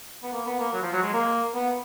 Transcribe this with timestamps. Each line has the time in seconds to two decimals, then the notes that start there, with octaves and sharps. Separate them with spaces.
0.23 B3
0.32 A#3
0.46 B3
0.59 A#3
0.73 F#3
0.83 F3
0.93 F#3
1.03 G#3
1.13 A#3
1.54 B3